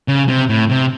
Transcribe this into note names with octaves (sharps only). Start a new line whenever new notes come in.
C#3
C3
A2
C3